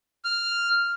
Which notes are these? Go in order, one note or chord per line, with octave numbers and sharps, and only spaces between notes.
F6